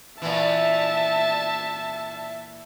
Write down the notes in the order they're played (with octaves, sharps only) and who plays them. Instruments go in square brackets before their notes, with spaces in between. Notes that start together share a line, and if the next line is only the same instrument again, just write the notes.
[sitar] A#2 E3 [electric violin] E5 A5